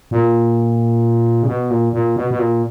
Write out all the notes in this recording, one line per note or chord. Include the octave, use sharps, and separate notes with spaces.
A#2
C#3
B2
A#2
A#2
B2
B2
A#2